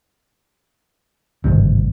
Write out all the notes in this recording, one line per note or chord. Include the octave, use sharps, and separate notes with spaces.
G#1 D2 G2 C3 D#3